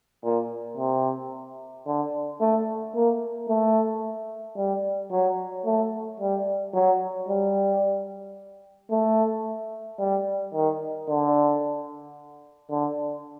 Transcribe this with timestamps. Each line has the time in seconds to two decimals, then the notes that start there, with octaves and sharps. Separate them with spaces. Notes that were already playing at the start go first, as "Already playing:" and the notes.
0.23 A#2
0.77 C3
1.86 D3
2.40 A3
2.94 A#3
3.48 A3
4.57 G3
5.11 F#3
5.65 A3
6.20 G3
6.74 F#3
7.28 G3
8.91 A3
9.99 G3
10.53 D#3
11.08 D3
12.70 D3